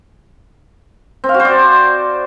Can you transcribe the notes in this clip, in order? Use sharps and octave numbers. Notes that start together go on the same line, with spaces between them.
C4
F5
F#4
C5
D5